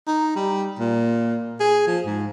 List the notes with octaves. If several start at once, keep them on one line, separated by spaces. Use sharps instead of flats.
D#4
G3
A#2
G#4
F3
G#2